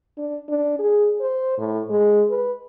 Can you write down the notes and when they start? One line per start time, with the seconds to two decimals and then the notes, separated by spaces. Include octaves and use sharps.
0.18 D4
0.49 D4
0.79 G#4
1.21 C5
1.58 A2
1.90 G#3
2.30 B4